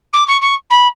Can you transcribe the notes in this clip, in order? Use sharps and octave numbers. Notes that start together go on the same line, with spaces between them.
D6
C#6
C#6
B5